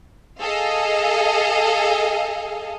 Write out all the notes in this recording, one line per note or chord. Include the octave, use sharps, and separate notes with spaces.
G#4 A4 D#5 F5